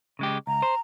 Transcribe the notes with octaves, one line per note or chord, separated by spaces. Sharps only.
C#3 G#3 G4
C#2 A#5
C5